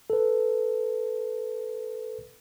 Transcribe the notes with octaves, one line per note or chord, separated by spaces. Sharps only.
A4 B4